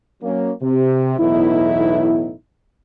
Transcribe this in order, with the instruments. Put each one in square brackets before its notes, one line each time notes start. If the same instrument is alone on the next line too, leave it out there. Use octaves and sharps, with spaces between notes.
[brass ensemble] F#3 A#3 C#4
C3
B1 E2 A2 B3 D#4 E4